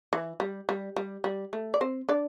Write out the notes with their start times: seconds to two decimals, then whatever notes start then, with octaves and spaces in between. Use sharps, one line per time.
0.13 E3
0.40 G3
0.69 G3
0.96 G3
1.24 G3
1.53 A3
1.74 D5
1.81 C4 C5
2.09 D4 D5